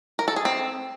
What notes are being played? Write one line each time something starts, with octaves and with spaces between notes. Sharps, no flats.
A#4
A4
G#4
C4